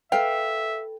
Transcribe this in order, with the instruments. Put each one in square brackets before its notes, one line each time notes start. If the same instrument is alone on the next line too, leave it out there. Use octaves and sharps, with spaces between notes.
[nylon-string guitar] A4 B4 [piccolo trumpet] E5 [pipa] F5 [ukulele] G5